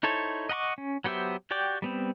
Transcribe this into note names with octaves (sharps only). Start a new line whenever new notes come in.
D#4 E4 A4 C5 C#5
D#5 F#5 A#5 C#6 D6
C#4
F#3 B3 G4 C5 E5
F#4 G4 D5 G5 D6
G3 B3 C4